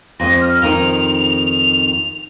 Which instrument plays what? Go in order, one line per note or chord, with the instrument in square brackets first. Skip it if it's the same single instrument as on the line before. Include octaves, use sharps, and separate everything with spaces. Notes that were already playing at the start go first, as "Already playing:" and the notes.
[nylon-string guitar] F2 D#5 [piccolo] A#6
[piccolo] F6
[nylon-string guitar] F2 D#3 D#4 [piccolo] F7